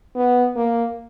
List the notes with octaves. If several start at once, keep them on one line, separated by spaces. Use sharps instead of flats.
B3
A#3